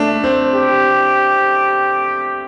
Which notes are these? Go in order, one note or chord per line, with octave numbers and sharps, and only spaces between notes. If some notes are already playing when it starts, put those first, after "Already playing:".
Already playing: A3 D4
C4
G4